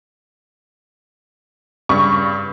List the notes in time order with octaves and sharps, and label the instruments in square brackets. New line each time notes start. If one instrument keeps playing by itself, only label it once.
[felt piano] G2 C#3 G3 [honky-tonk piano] C#6